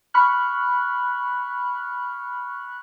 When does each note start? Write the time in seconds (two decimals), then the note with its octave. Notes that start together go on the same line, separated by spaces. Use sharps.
0.14 B5 C#6 F6 F#6